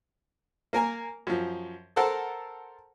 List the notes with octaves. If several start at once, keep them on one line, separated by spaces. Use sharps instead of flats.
A#3 A#4 G#5 A#5
F#2 F3
A4 A#4 C5 F#5 A5 E6